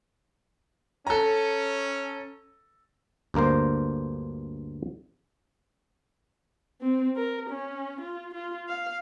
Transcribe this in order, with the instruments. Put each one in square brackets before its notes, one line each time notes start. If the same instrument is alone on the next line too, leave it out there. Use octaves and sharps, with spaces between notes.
[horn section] C#4 [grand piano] A4 A#5
[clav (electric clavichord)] D2 G2 A#3 A#4 C5
[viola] C4
A#4
C#4
F4
F4
F5